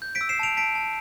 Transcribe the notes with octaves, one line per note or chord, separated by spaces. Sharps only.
G6
B6 D7
E6
C7 E7
A5 D7 F7
A5 B6 D7
A5